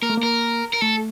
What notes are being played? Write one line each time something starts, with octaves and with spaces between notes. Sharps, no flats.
A#3 A#4
A3
A#3
A#4
A#4
A3 A4